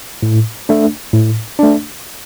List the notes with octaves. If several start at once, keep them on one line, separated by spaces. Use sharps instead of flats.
A2
A3 D4
A2
A3 D4